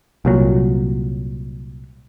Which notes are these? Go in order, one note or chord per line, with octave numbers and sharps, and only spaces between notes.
C2 A#2 F#3